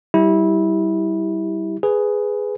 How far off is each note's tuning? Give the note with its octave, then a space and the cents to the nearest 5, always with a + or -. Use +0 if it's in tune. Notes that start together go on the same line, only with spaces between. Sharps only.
G3 -20 E4 -20 G4 +0
G#4 +0 B4 +10